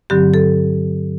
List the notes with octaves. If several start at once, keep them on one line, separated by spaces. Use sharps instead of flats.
G2 D3 F#3 C4 G4
A4